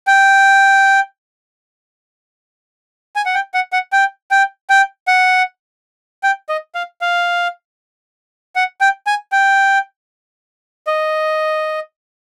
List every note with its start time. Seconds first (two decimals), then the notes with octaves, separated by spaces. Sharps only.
0.07 G5
3.16 G#5
3.26 F#5
3.34 G5
3.54 F#5
3.73 F#5
3.93 G5
4.31 G5
4.70 G5
5.08 F#5
6.23 G5
6.49 D#5
6.75 F5
7.01 F5
8.56 F#5
8.81 G5
9.07 G#5
9.32 G5
10.87 D#5